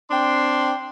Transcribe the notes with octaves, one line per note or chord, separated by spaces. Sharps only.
C4 D4 G5 C6